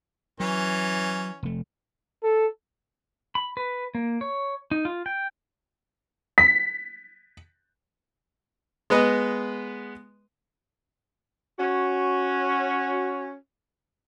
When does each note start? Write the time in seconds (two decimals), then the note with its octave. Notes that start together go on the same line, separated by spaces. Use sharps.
0.40 E3 F#3 C#4
1.43 F1 A3
2.23 A4
3.35 B5
3.57 B4
3.95 A#3
4.21 C#5
4.71 D#4
4.85 F4
5.06 G5
6.38 B6
8.90 G#3 B3 B4 D#5
11.59 C#4 F#4